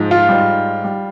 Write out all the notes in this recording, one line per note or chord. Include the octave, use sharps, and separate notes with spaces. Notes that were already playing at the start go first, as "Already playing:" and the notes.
Already playing: G#2 F3 G#3
F4
G#2 G3
G3